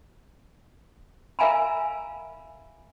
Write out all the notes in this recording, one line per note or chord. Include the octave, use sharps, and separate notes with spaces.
A#4 E5 F5 G#5 A#5 B5